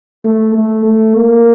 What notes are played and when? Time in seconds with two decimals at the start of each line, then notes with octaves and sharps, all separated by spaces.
0.24 A3
0.54 A3
0.85 A3
1.16 A#3